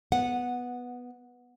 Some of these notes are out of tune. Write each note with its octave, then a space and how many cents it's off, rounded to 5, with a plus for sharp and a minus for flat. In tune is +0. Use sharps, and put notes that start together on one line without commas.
B3 +0 F#5 -10